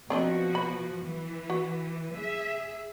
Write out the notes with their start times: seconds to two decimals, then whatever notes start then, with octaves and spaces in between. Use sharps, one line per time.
0.10 B2 F3 C4 D4 F#4 D#5
0.55 B5
1.04 E3
1.50 F#4
2.11 G#4 E5